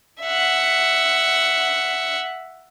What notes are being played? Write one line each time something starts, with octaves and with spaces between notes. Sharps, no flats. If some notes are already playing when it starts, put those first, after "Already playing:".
E5 F#5